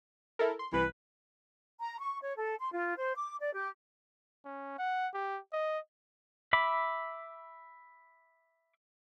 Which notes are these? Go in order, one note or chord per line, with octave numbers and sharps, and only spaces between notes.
E4 A4 A#4
C6
C2 E3 B4
A#5
C#6
C#5
A4
C6
F4
C5
D6
D5
G4
C#4
F#5
G4
D#5
E5 B5 D6